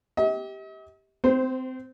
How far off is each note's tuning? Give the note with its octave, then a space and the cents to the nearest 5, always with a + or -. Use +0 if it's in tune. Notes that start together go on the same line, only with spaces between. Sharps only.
G4 +0 D#5 +45
C4 -25 C5 +0